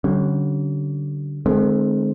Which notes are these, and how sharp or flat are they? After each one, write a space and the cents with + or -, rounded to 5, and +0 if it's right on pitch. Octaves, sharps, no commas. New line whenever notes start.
D3 -10 G3 -45 C#4 -10
D#3 -40 G#3 +30 C4 +5